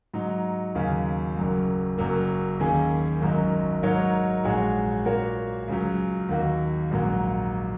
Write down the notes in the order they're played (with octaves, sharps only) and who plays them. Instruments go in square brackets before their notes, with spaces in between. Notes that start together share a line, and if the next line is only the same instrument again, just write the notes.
[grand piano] G#2 F#3 D#4
D#2 C#3 F#3 C#4
F#1 F#2 F#3
F#1 F#2 F#3 A#3
D#2 D#3 A#3 C#4 G#4
G#1 F#2 F#3 D#4
G#2 F#3 D#4 A#4 C#5
A#1 G#2 G#3 F#4 C#5
A#2 A#3 F#4 A#4 C#5
C#2 C#3 F#3
D#2 D#3 A#3 F#4
A#1 G#2 F#3 A#3